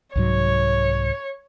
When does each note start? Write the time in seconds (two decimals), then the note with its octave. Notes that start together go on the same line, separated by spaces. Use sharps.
0.16 C2 G#2 F#3 C#5